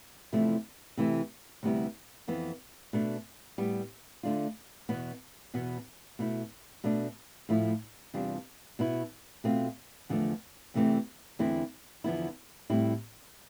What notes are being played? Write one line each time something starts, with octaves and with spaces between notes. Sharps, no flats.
E2 C3 F3 A3 E4
C3 E3 A3 E4
D2 C3 G3 B3 E4
F2 E3 B3
B2 A3 D4
A2 G3 B3
D3 A3 D4 F4
E2 B2 B3
E2 B2 B3
B2 A3 E4
B2 A3 D4
A2 F3 A3 E4
E2 C3 G3 D4 F4
B2 B3 E4
B2 A3 C4 F4
E2 D3 F3 A3
E2 C3 E3 A3 C4
E2 D3 A3 C4 E4
E2 D3 F3 B3 E4
A2 G3 C4 E4